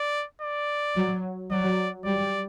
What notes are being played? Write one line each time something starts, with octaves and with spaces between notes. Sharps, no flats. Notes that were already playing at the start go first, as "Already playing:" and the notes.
Already playing: D5
D5
F#3
F#3 D5
G3 D5